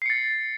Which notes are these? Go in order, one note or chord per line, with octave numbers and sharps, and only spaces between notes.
A6 C7 C#7